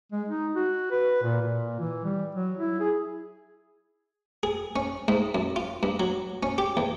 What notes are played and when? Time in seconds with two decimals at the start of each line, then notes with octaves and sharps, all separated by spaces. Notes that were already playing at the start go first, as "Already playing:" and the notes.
0.12 G#3
0.28 D#4
0.56 F#4
0.91 B4
1.23 A#2
1.42 A#2
1.80 E3
2.05 G3
2.35 F#3
2.57 E4
2.80 G#4
4.43 G#4
4.76 C#4
5.08 G#2
5.35 F#2
5.56 F4
5.83 G2
6.00 F#3
6.43 C#4
6.58 G4
6.77 E2